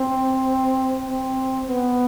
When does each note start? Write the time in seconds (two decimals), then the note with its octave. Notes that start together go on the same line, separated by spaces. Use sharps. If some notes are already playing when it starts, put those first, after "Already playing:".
Already playing: C4
1.08 C4
1.67 B3